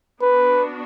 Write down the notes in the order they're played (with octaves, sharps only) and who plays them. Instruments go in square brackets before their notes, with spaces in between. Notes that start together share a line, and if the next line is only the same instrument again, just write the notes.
[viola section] B3 D4 F#4 [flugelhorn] B4